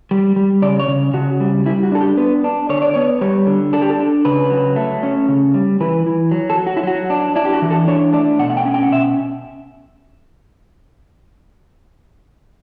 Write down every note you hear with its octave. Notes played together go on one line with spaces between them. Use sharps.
G3
G3
C#3 D5
C#5
C#3
C#3 F#4
G3
G3 E4
F#4
D4 A4
G4
B3 B4
D4
D3 C#5
D5
B3 C#5
G3 C#5
D3
D4 A4
G4
A4
D4
C#3 B4
F#3
A3
C#4
C#3
G3
E3 B4
E3
F#3
A4
F#3
F#4
E4
F#3 F#4
D4
D4 E4
G4
F#4
E3
A4
D4 C#5
A3 D5
B2 F#5
F#5
G5
C#4
G5
F#5
B2 E5